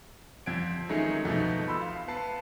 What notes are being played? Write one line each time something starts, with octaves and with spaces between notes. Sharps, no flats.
F2 C4 G#6 D7
D#3 F#3 G#3 A3 C#4 D#4
F2 B2 A3 D#4
B5 C6 E6
F5
B3 B4 A5 C7